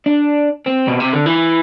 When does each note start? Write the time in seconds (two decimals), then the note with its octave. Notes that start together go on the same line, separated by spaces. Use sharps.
0.06 D4
0.66 C4
0.88 B2
1.00 C3
1.13 D3
1.26 E3